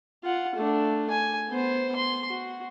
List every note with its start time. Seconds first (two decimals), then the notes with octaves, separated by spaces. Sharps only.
0.24 F4 F#5
0.56 A3 D4
1.10 G#5
1.49 B3 C5
1.96 C6
2.29 F#4